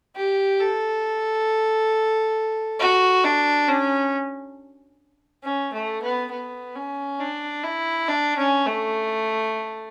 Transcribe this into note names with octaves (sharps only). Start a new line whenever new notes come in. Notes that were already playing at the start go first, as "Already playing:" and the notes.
G4
A4
F#4
D4
C#4
C#4
A3
B3
B3
C#4
D4
E4
D4
C#4
A3